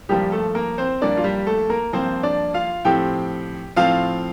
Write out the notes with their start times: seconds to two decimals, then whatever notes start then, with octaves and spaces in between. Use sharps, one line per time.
0.09 G2 F3 G3 A#3 G4
0.32 A3 A4
0.55 A#3 A#4
0.78 C4 C5
1.01 G2 F3 A#3 D4 D5
1.17 F4
1.24 G3 G4
1.47 A3 A4
1.70 A#3 A#4
1.93 G2 F3 A#3 C4 C5
2.23 D4 D5
2.54 F4 F5
2.85 A2 F3 C4 G4 G5
3.76 A2 F3 C4 F4 F5